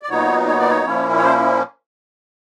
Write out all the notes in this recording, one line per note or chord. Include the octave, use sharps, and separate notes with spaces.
D5
A#2 F#3 B3 D#4 C#5
C#5
D5
C#5
A#2 F3 A#3 C#4 E4
C#5
C5